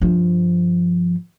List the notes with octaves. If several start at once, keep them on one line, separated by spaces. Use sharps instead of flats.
G2 F3